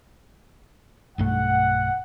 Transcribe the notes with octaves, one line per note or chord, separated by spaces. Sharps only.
B1 G2 A3 F#5